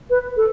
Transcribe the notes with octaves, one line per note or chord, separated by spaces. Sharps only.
B4
A4